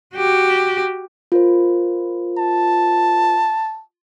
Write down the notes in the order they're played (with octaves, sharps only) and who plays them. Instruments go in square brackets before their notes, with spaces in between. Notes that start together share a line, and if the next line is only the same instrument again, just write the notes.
[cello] F#4 G4
[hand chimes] F4 A#4 C5
[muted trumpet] A5